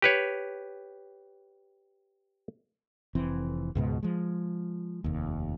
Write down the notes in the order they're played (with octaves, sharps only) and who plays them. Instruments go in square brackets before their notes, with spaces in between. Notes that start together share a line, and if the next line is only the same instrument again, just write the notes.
[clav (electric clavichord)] G4 B4 C#5
[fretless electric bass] F1 E3 C4
C#2 G#2 B2
F3 G#3
F1 D#2